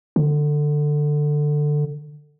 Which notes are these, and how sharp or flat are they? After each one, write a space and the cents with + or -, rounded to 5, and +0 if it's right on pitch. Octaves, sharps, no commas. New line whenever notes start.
D3 +15